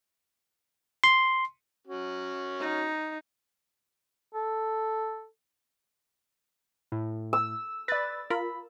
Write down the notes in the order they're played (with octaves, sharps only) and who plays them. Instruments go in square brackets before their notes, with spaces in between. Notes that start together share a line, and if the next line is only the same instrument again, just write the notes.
[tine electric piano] C6
[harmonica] C#4 F#4
[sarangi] D#4
[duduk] A4
[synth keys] A2
[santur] E6
[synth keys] B4 [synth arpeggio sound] D5 A6
[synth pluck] F4 A#4 [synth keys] B5